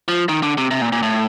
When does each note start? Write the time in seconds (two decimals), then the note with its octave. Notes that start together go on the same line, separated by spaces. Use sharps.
0.08 F3
0.29 D#3
0.43 D3
0.58 C3
0.71 C3
0.82 A#2
0.92 A#2
1.03 A2